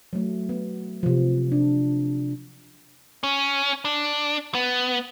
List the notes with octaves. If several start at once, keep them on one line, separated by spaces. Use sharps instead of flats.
F#3 A3
B3
C3 F3
D4
C#4
D4
B3